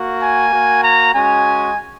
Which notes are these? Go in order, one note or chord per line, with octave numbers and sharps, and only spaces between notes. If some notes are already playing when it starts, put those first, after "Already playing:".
Already playing: A#3 F#4
G#5
A#3 F#4
A#5
G#3 C#4 F#4 G#5